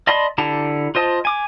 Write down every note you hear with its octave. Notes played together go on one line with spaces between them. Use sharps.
D5 D#5 A5 B5 C6
D3 E4 G4 A5 A#5
F4 C5 D#5 A5
G#5 D6